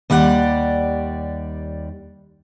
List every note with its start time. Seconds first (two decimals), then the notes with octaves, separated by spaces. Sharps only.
0.10 D#2 G3 D5 F#5